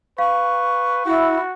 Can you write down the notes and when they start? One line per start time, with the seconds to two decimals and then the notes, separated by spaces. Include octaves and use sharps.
0.18 B4 F5 C#6
1.06 E4 F#4